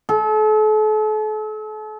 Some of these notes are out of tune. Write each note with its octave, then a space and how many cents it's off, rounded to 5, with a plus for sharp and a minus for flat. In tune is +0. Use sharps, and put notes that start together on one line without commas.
A4 -40